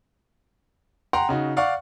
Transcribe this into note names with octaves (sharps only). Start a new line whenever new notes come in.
F#5 G5 A#5 C6
C#3 D#4 F#4
D5 F5 F#5 C#6